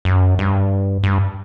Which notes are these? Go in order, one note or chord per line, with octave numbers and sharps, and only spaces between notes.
F#2
G2
G2